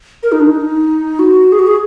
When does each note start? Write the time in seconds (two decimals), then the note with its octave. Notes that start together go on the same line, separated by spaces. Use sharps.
0.23 A#4
0.32 D#4
0.40 D4
0.47 D#4
1.19 F#4
1.52 G#4
1.59 F#4
1.67 G#4